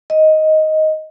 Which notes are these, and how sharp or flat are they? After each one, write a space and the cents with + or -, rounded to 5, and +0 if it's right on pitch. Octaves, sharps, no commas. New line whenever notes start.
D#5 +5